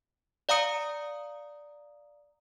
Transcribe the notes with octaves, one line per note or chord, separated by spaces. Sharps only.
D5 F5 A#5 D#6 C#7